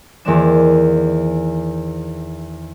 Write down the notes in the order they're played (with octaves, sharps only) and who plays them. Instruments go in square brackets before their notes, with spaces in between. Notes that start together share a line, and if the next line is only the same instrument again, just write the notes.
[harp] E2 D#3 A#3 C4 D4 E7